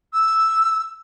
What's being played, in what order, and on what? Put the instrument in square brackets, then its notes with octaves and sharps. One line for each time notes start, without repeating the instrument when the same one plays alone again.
[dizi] E6